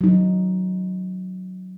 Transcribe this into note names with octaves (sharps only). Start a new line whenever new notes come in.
F#3 D#4